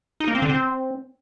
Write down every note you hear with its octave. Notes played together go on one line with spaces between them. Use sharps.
D#4
A#3
C4
D3
C4